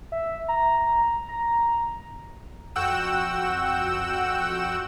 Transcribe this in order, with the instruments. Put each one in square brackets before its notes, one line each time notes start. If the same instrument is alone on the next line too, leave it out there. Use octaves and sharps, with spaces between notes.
[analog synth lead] E5
A#5
A#5
[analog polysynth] F2 F#4 F#5 G5 E6 E7